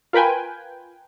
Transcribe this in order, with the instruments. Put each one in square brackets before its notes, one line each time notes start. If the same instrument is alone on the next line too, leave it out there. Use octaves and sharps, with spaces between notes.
[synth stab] F4 A#4 B4 G5 G#5